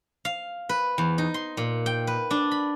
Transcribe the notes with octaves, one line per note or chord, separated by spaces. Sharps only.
F5
B4
E2
D#4
C6
A#2
G5
B4
D4
B5